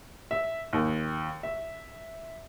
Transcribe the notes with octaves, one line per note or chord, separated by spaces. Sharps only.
E5
D#2
E5